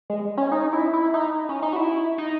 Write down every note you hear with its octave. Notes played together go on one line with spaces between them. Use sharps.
G#3
C#4
D#4
E4
E4
D#4
C#4
D#4
F#4
E4
D#4